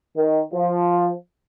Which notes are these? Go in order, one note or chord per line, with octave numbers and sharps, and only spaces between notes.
D#3
F3